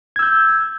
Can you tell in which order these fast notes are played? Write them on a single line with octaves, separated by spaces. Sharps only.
G#6 E6 G6